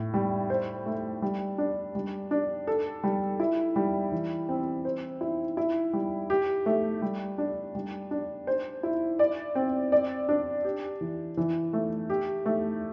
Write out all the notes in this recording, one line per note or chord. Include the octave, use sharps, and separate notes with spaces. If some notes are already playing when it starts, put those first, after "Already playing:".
Already playing: A2
G3
C5
A3
G3
D4
G3
D4
A4
G3
E4
G3
E3
C4
C5
E4
E4
G3
G4
A3
G3
D4
G3
D4
C5
E4
D5
C4
D5
D4
G4
E3
E3
A3
G4
A3